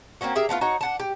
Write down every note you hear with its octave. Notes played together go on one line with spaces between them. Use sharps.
A#3 C4 C#4 F#4
G4 G#4 A#4 E5
A3 B3 C#4 F4
D#4 F#4 C#5
D4 F#5 A5
G4